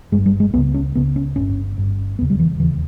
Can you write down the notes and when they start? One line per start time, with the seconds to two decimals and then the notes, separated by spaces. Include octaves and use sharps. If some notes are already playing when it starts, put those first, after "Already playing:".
0.12 G1 G2 G#3
0.26 G3
0.40 G#3
0.54 C#2 B3
0.58 C#3
0.74 C#4
0.95 C#2 C#3 B3
1.16 C#4
1.36 G1 G2 C#4
1.78 G1 G2
2.19 E1 D#2 C#3 B3
2.30 G3
2.39 E3
2.60 E1 D#2 C#3 E3